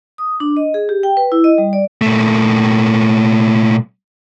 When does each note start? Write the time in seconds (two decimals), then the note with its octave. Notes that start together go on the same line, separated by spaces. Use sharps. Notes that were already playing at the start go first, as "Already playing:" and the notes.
0.18 D#6
0.40 D4
0.57 D#5
0.74 G#4
0.89 G4
1.03 G5
1.17 B4
1.32 E4
1.44 D#5
1.58 G3
1.73 D5
2.01 A#2 A3